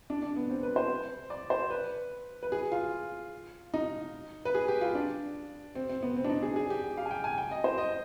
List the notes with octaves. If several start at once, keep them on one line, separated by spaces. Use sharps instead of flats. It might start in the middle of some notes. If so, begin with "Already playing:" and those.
D4
D4
B3
C4
B4
C5
D5
C5
B4
B4
G#4
F4
D#4
B4
G#4
G4
F4
D4
C4
C4
B3
C4
D4
D#4
G#4
G#4
G4
G4
F5
G#5
G5
G#5
G5
D#5
C5
D#5